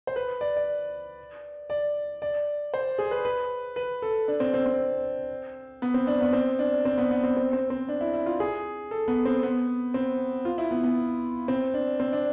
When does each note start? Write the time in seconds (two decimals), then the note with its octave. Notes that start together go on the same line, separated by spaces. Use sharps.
0.07 C5
0.16 B4
0.41 D5
0.57 D5
1.70 D5
2.22 D5
2.74 C5
2.98 G#4
3.11 B4
3.25 B4
3.76 B4
4.02 A4
4.28 D4
4.40 C4
4.54 C4
4.66 C4
5.82 B3
5.94 C4
6.07 D4
6.21 B3
6.33 C4
6.59 D4
6.85 C4
6.98 B3
7.11 B3
7.23 C4
7.37 C4
7.53 C4
7.70 C4
7.89 D4
8.01 E4
8.13 E4
8.26 F4
8.40 G#4
8.91 A4
9.08 B3
9.25 C4
9.43 B3
9.94 C4
10.45 F4
10.58 E4
10.71 B3
10.84 B3
11.48 C4
11.74 D4
12.00 C4
12.13 D4